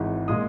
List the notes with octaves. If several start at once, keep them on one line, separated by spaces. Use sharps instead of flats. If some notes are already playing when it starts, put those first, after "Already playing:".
Already playing: G#1 G#2 E3
A#2 G#3 D#6